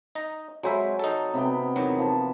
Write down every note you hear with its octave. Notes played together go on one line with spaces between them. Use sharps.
D#4 A#5
F#3 G#3 C5 E5 G#5 B5
D#4 A4
C3 B3 G5
E2 D#3 F#3
F3 A5